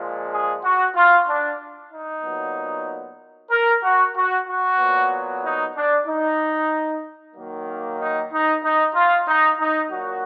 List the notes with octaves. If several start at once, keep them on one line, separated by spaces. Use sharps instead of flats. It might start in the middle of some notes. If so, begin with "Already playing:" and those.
Already playing: A#2 F3 G#3
G#4
F#4
F4
D4
D#4
A#2 F#3 B3
A#4
F#4
F#4
F#4
A#2 F#3 B3
D#4
D4
D#4
D#3 F#3 A#3
D#4
D#4
D#4
F4
D#4
D#4
A#2 F#3 A#3 F#4